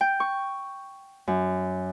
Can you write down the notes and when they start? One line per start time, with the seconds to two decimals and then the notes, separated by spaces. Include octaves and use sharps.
0.01 G5
0.20 C#6
1.28 F#2